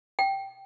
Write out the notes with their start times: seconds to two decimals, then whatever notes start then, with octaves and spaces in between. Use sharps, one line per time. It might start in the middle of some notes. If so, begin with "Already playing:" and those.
0.19 G5